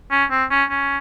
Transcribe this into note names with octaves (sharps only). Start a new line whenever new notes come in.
C#4
C4
C#4
C#4